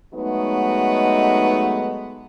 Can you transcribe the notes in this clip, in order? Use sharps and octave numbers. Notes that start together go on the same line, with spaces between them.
F#3 G#3 A3 B3 D#4